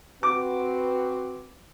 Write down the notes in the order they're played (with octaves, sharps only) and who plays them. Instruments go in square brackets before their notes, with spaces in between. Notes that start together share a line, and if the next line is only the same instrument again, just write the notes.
[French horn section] C4 F#4 B4 [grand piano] D6